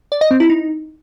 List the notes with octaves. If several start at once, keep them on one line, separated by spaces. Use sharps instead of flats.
D5
D#5
C4
E4
D#4